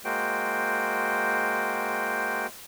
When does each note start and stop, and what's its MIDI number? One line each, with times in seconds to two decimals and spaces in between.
0.05 2.46 56
0.05 2.46 58
0.05 2.46 66
0.05 2.46 72
0.05 2.46 79